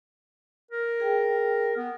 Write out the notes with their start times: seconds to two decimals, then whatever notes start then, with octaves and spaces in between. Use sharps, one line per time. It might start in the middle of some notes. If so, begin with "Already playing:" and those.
0.71 A#4
1.00 G#4 G5
1.77 B3